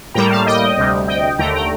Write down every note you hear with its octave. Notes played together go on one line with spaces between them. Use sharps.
A2 G3 A#3 G5 A#5
F5 A5
D#5 G5
D2 C3 G3
D#5 G5
D#2 D3 A3 G5 A#5
G5 A#5